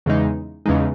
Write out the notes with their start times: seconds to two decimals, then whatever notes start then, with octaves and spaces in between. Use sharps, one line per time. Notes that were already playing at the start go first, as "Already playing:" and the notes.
0.06 E2 C#3 E3 G#3 D#4
0.66 E2 C#3 E3 G#3 D#4